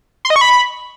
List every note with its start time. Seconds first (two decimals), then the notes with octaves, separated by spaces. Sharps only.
0.25 C6
0.30 D#5
0.36 C#6
0.41 B5